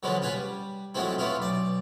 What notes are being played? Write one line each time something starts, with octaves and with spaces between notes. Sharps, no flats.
D3 F3 F#3 G#3 B3
C#4 F4 B4 G#5
G3
F3 F#3 G#3 A3 C4 E4
A3 B3 C#4 E4 F4
B1 D5